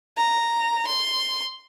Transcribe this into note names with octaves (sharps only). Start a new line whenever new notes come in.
A#5
C6